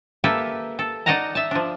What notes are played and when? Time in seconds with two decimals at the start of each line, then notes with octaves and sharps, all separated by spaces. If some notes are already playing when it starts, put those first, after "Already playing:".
0.24 A#3 G4 A4 B4 E5
0.79 A4
1.06 D#4 D5 D#5 F#5 A5 A#5
1.35 E5 A5
1.51 F3 D4